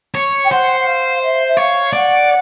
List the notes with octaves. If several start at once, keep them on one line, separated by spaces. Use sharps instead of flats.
C#5
G5
C5 F#5
F#5
F5
E5
E5
C#5 F5
D5 F#5